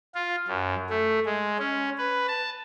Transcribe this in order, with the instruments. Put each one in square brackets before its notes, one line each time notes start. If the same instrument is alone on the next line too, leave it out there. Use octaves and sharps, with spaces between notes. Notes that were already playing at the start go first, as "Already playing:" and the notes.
[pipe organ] F4
F#2
A3
G#3
C#4
B4
A5